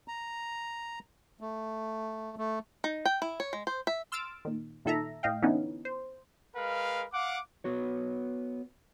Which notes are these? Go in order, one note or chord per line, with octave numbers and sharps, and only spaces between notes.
A#5
A3
A3
D#4
G5
E4
C#5
G#3
C5
E5
C6 E6 F6 A6 D7
A#2 D#3
A#2 D#3 A4 E5 A#5
A2 D#5 F5 G5
D3 E3 B3 C#4 D#4
C5
G#3 A#4 B4 F5
F5 F#5 D6
B3 F#4 C#5